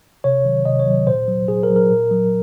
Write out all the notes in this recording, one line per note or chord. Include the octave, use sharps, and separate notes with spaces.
C3 C#5
D#3 F#3
C3 D#5
C#5
D#3 F#3
A#2 C5
F#3
A#2 G#4
A#4
F#3
A#4
A#2
F#3